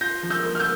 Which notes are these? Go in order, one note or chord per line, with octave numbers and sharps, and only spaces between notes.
F4 G6 A#6
F3
E6 G6
A#3
F6
E6 G6